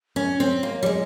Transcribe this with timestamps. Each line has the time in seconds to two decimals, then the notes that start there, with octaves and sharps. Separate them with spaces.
0.16 C#4
0.40 C4 C#5
0.63 A#3
0.83 G3
0.86 G#3